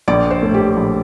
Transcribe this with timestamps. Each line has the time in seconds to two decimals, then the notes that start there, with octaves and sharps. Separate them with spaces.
0.08 A#1 D5
0.31 C5
0.42 A2 A3
0.54 G4
0.77 A#1